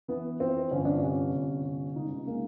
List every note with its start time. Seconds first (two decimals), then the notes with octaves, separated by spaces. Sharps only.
0.08 E3 B3
0.40 F2 C4
0.71 G1 C#4
0.85 D4
0.99 C3 C#4
1.34 G1
1.65 C3
1.96 C#2 D#4
2.27 G#3 A#3